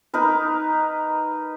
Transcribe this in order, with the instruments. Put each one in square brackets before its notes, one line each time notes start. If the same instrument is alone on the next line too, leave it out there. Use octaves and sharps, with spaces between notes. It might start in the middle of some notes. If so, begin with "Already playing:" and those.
[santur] D#4 A#4 B4